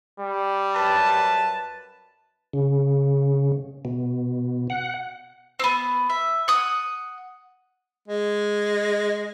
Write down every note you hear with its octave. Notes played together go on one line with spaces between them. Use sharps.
G3
F#2 B4 A5
C#3
B2
F#5
B3 C4
E5
F#5 D#6
G#3